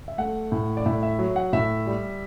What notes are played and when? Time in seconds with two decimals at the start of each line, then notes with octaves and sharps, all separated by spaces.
0.08 E5
0.18 A3 F#5
0.52 A2
0.77 D5
0.86 A2 E5
1.03 E5
1.19 F#3
1.36 F#5
1.53 A2 E5
1.86 G3